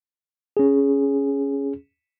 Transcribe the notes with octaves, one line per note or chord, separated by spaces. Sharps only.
C#4 G#4